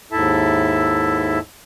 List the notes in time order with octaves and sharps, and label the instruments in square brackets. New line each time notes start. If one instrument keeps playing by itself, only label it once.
[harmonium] D#2 G#2 E4 A4 E5 A5